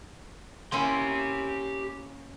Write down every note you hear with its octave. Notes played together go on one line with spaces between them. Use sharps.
A#3 C#4 E4 G4 C6